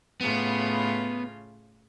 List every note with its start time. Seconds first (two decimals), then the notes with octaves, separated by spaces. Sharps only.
0.21 A2 C#3 B3 F4